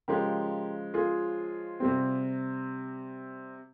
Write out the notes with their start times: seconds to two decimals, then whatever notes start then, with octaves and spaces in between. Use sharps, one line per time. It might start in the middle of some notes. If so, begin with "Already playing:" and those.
0.08 C#3 F3 G#3 G4 A#4
0.94 F4 G#4
1.80 C3 G3 C4